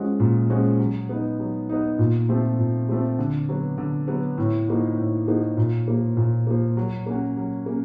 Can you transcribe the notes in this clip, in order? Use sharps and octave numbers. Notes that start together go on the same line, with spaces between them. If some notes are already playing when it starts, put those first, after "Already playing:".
Already playing: F3 G#3 C#4 F#4
A#2
F3 G#3 C#4 F#4
F#3
B3 D#4
F#3
B3 D#4
A#2
F3 A3 C4
A#2
F3 A3 C4
D3
F#3 B3
D3
F#3 B3
A2
F3 A#3 D#4 F#4
A2
F3 A#3 D#4 F#4
A#2
F3 A#3
A#2
F3 A#3
F#3
A#3 C#4 F#4
F#3
A#3 C#4